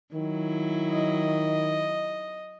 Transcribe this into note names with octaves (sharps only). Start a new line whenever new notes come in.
D#3 F#3 E4
D#5